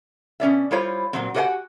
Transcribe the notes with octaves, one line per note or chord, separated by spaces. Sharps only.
B2 C#4 D5 E5
G3 E4 F4 C5 C#5
A#2 F#3 C4
F#4 G4 B4 D#5 F#5 G#5